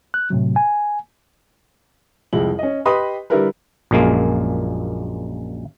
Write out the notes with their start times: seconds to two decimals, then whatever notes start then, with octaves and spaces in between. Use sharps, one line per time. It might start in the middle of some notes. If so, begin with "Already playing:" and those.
0.14 F#6
0.30 A2 C3 F#3
0.56 G#5
2.33 C2 F2 G#3 E4 F#7
2.59 C#4 D#5
2.85 G4 B4 D#5 B5 C6 D#6
3.30 D3 G3 E4 G4 A#4 B4
3.91 A#1 F#2 A#2 G#3 A#3